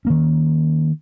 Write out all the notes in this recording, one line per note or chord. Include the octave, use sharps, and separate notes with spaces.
D#3 A#3 C#4